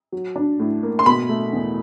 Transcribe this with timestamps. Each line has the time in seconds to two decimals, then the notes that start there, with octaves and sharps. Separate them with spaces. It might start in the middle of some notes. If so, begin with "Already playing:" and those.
0.12 F#3
0.36 D4
0.60 A2
0.83 A#3
0.99 C6
1.06 B2 B5
1.29 A3
1.53 E2